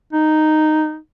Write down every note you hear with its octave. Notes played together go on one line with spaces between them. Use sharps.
D#4